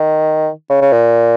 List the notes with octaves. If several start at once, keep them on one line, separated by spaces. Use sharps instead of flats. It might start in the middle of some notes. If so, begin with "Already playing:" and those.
Already playing: D#3
C#3
C#3
A#2